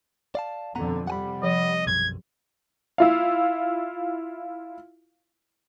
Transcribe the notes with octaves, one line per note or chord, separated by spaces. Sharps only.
D5 F5 A5
F2 B2 D3 B3 F#5 A#5
C3 G3 F#5 G#5 B5
F3 D#5
B1 F#2 G#6
E4 F4 F5